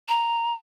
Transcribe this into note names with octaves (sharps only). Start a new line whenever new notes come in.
A#5